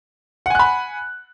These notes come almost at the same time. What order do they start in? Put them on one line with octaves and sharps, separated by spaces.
F#5 G#5 F#6 B5